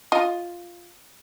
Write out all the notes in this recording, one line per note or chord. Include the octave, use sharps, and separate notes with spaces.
F4 D#5